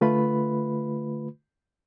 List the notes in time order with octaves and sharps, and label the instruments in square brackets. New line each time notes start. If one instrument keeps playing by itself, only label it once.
[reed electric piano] D3 A3 F4 B4 B5